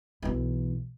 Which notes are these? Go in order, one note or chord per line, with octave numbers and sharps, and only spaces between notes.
B1 E3